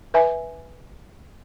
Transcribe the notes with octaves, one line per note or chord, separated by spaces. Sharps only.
B4 E5 G#5